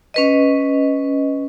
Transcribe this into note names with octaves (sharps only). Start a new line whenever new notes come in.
C#4 B4 D#5